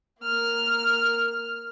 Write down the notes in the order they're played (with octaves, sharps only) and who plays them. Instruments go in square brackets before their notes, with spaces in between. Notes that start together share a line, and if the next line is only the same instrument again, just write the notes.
[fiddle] A#3 F6